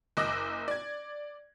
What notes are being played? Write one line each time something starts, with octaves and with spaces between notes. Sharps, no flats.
F#1 D#5 D6 E6 F#6 A#6
D5 G#6